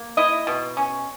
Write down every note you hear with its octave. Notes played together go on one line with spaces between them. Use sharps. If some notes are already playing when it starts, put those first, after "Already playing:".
Already playing: A#3
E4 D#5
B2
C#4